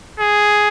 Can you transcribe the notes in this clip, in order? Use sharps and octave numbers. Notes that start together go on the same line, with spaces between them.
G#4